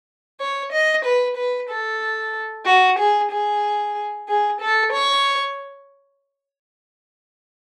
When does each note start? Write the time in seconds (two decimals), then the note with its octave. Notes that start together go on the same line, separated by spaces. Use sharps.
0.39 C#5
0.72 D#5
1.04 B4
1.37 B4
1.69 A4
2.66 F#4
2.99 G#4
3.31 G#4
4.28 G#4
4.60 A4
4.93 C#5